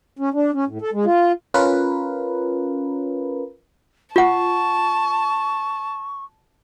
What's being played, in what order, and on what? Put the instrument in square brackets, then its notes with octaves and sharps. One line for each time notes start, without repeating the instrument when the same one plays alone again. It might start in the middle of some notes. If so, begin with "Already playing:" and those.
[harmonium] C#4
D4
C#4
A2
A4
G#3
F4
[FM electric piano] C#4 F4 A#4 B4
[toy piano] F4 F#5 [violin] A5 [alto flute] C#6